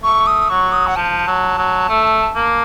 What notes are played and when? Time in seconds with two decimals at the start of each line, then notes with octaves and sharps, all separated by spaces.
0.03 A3 C#6
0.27 D#6
0.49 F#3 C#6
0.72 D#6
0.87 F#5
0.96 F3 A5
1.27 F#3
1.58 F#3
1.89 A3
2.35 A#3